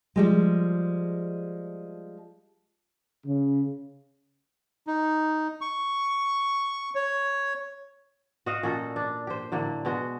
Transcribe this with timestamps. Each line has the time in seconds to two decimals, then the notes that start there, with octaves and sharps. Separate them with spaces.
0.16 F3 G3 G#3
3.27 C#3
4.87 D#4
5.61 C#6
6.95 C#5
8.46 F#4 D#5 F5
8.63 A#2 C#4 F#4 A4
8.96 D4
9.27 G4 C5
9.52 A2 D3 F#3 A#3
9.85 B2 G#3 F#4